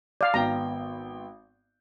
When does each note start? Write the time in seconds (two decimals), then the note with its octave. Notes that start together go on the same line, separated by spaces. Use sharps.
0.21 D5 F5
0.34 G#1 B3 G5 A#5